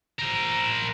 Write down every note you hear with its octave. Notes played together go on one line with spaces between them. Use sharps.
A#4 C5